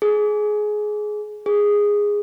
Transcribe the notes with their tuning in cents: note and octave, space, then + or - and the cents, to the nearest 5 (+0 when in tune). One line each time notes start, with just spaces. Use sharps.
G#4 +20
G#4 -10